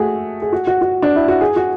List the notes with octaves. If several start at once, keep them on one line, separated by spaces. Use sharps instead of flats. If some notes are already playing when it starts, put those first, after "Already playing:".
Already playing: A3 F#4 G#4
G#4
F#4
F#4
F#4
D4
E4
F#4
G#4
F#4